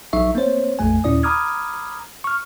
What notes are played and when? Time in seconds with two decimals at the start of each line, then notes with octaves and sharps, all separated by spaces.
0.13 A#1 F#3 D#4 E5 C#6
0.35 A#3 C4 C5 C#5
0.79 A#1 F2 A3 G#5
1.04 D#2 A#2 C#4 E4 D5 D#6
1.23 A#5 B5 D6 D#6 F6 G#6
2.24 C#6 F6